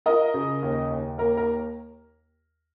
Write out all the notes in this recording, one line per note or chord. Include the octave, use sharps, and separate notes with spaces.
F4 A#4 D#5
C#3
D#2
D#2
A#3 A#4
A#4